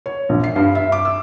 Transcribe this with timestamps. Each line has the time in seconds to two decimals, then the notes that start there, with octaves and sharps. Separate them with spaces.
0.06 C#5
0.29 A#1
0.44 C7
0.56 G2
0.75 E5
0.92 D6
1.05 E6